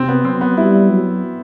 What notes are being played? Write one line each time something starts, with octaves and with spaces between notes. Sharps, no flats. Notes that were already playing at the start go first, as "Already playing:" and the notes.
Already playing: C3 C4
B3
F#3 C4
B3
G3 E4
F#3